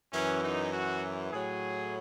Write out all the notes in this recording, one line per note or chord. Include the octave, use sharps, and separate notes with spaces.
F#2 E3 C#4
D#4
F#4
A2 F#3 G#4